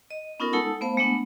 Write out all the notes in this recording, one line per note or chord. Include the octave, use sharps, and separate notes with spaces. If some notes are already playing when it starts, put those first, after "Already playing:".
D#5
B3 C#4 D#4 F4 A4 A#4
G#3 D#4 A4 F#5 A5 E6
A3 B3 C5 F5
G#3 A3 B3 D4 F#5